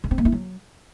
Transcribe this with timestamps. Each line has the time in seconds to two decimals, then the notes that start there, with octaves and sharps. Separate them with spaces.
0.04 D3
0.11 C4
0.18 A#3
0.25 E4
0.32 F#3